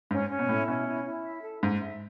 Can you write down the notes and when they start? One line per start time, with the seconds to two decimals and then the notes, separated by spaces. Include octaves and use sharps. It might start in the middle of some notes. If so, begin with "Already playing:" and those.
0.11 G#2 C#4
0.30 C#4
0.39 B2
0.49 A2 E4
0.67 B2 C#4
0.87 E4
1.05 E4
1.24 E5
1.43 A4
1.62 G#2 D#4
1.81 E5